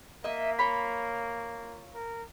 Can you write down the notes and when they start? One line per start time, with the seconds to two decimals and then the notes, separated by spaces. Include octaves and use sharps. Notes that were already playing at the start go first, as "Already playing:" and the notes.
0.24 A#3 D#5 E5
0.59 F4 C#5 B5
1.95 A#4